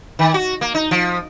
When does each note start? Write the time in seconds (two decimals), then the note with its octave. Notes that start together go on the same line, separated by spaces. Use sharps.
0.19 D#3
0.34 F#4
0.61 A#3
0.75 D#4
0.91 F3